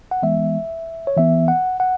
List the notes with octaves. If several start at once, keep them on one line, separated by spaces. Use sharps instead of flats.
F#5
E3 G#3 B3 E5
C#5
E3 B3 E5
F#5
F#5